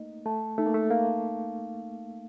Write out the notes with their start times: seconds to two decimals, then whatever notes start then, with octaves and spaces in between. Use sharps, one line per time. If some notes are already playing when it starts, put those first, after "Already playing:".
Already playing: A3 A#3 D#4 D#5
0.26 A3 A5
0.58 A3 D#4
0.66 A#3
0.74 A3
0.90 A#3 F5